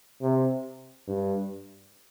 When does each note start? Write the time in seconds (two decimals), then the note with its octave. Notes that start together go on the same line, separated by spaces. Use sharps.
0.21 C3
1.08 G2